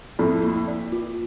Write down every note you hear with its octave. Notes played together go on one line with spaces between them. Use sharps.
F2 A2 D5
A#3
D5
F4